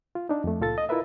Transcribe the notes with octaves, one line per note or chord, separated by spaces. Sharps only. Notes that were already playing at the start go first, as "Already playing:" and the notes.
F4
D4 D#4
F2 A3
C#2 A#2 F4 A4 A6
D#5
E4 F4 A#4 B4 E5